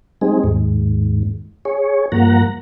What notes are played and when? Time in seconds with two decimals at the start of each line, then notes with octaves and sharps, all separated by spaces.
0.21 G3 G#3 C4 D#4 G#4
0.44 D#2 G#2
1.65 G#4 C#5
2.12 G2 F3 A#3 F#5 A#5